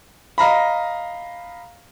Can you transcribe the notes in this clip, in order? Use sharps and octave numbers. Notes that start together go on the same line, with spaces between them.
D#5 F5 A#5 B5